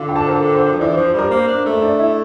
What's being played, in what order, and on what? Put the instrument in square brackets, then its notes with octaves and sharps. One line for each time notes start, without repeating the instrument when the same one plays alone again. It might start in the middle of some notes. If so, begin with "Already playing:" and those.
Already playing: [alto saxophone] D3 [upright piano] F4 F5
[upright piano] G5
A4 A5
C5
A#4
C5
[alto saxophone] F3
[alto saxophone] E3 [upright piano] D4 D5
[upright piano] C5
[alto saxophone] F3
[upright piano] C5
[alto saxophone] G3 [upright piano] A#4
[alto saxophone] A#3 [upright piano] C5
[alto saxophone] D4
A3
[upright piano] E5
D4 D5
E4 E5